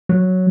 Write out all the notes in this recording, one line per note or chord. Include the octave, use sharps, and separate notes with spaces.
F#3